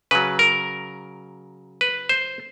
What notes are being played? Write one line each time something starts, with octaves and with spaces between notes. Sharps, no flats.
C#3 F#3 B4
A#4
B4
C5